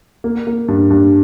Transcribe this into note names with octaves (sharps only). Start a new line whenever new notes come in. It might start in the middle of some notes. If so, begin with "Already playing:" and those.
A#3
A#3
G2
G2